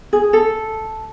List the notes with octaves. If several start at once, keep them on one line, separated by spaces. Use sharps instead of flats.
G#4
A4